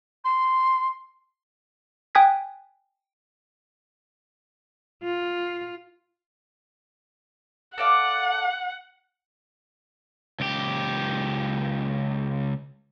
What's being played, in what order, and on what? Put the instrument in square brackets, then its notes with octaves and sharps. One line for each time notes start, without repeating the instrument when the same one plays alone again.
[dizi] C6
[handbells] G5 G#5 D#6 F#6 G#6 B6
[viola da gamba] F4
[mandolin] A4 D5 F5 [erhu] F#5
[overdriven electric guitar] C#2 G4